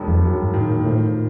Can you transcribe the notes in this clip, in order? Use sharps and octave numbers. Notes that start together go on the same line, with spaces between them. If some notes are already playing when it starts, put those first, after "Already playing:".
Already playing: E1 D#2
F2
G2 F#3
G#2
A2 D#3
A#2
A2 F3